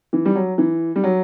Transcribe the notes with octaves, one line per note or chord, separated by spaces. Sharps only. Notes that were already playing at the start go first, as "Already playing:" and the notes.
E3
G3
F#3
E3
G3
F#3